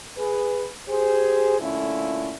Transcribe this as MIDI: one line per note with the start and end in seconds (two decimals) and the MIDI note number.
0.17 0.66 68
0.17 0.66 71
0.89 1.57 67
0.89 1.57 68
0.89 1.57 72
1.59 2.33 46
1.59 2.33 50
1.59 2.33 57
1.59 2.33 61
1.59 2.33 64
1.59 2.33 65